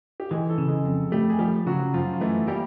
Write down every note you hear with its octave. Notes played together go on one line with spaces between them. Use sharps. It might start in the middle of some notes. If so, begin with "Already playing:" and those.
G4
E3 G#3 G#4
A3 A4
C#3
G#3 G#4
F2
G3 A3 G4
G#4
F3 G3 G4
C#3 F#3 F#4
F#2 F3 F4
F4
E3 A3 E4
G3 A#3 G4